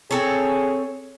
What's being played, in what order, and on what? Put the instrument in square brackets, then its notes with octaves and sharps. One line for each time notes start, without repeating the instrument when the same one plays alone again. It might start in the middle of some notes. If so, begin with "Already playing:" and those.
[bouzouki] C4 A4 C#5 [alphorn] G#4